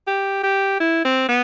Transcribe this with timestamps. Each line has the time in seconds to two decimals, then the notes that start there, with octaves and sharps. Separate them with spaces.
0.07 G4
0.43 G4
0.80 E4
1.04 C4
1.28 B3